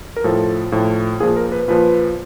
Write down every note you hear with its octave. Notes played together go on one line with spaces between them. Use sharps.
A#4
A2 F3 A4
A2 F3
A#2 F3 G#4
A#4
B4
A#2 F3 B4